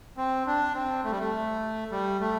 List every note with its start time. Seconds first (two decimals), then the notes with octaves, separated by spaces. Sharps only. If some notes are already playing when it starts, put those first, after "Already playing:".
0.17 C4
0.47 D4
0.75 C4
1.04 A3
1.11 G3
1.19 A3
1.91 G3
2.21 A3